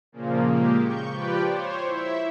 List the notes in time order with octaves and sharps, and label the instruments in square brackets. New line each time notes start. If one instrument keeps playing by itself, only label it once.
[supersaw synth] A#2 C#3 F3 A#3
G#3 A#3 G4
C#6 G6
F3 G4 B4 D5 G5
C5 C#5
E4 E5